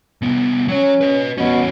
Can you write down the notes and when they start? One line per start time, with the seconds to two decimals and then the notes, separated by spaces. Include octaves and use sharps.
0.22 C2 B3
0.68 F#3 C#4 C#5
1.01 B4 D#5
1.38 E2 B2 C#4